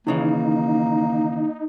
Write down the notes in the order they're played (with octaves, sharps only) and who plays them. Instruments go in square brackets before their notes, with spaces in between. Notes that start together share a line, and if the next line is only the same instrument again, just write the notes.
[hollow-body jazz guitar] D#2 C#3 E3 [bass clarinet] A#3 [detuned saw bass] D#4